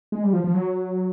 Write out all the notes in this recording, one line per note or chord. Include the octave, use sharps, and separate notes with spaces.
G#3
G3
F3
F3
F#3